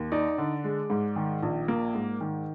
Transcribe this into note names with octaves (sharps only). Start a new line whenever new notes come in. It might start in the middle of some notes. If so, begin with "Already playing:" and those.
Already playing: D#2
D#4 D5
D3
G#3
G#2
D#3
A#1
A#3
G#2
D#3